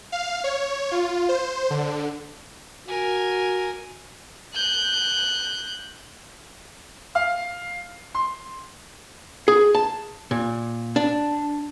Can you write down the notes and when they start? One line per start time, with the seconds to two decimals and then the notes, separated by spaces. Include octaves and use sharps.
0.12 F5
0.44 C#5
0.91 F4
1.29 C5
1.70 D3
2.88 F#4 A#4 G#5
4.55 F#6 G6
7.15 F5
8.15 C6
9.48 G#4
9.74 A5
10.31 A#2
10.96 D4